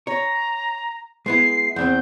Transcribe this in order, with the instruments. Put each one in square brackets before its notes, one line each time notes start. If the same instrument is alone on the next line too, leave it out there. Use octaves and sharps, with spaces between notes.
[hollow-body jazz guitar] C#5 [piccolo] A#5
[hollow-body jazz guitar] G#3 B3 E4 [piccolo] C7
[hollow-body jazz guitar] E2 E3 C4 [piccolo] G6